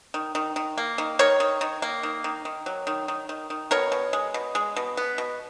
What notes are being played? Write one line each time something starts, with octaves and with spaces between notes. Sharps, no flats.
D#3
D#3
D#3
A#3
D#3
D#3 A#4 C#5
D#3
D#3
A#3
D#3
D#3
D#3
F#3
D#3
D#3
D#3
D#3
B2 A#4 C#5
B2
G#3
B2
G#3
B2
B3
B2